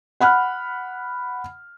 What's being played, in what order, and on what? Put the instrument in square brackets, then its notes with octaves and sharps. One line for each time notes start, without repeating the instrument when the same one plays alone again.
[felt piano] F#5 B5 F6 F#6